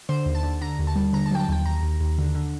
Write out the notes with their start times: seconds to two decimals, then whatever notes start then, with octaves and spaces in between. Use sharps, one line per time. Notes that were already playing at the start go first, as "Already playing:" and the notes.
0.09 D3 C5
0.26 D#2
0.35 A5
0.43 D3
0.61 D3 A#5
0.79 D#2
0.87 A5
0.95 G3
1.13 D3 A#5
1.26 A5
1.31 F#3 G5
1.40 A5
1.49 D#2 G5
1.65 D#2 A#5
1.82 D#2
2.00 D#2
2.18 D3
2.35 D3